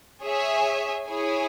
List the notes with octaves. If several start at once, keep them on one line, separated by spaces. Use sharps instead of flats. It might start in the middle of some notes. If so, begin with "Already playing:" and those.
G#4 C#5 E5 G#5
E4 G#4 C#5 G#5